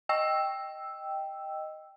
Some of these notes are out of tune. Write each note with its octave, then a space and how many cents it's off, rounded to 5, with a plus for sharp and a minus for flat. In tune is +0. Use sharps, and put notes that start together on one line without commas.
D#5 +0 G5 +0 E6 +0